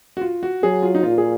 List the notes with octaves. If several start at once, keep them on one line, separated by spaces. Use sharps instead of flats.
F#4
F4
F#4
F#3 G#4
F4
D#4
A#2 F4
G#4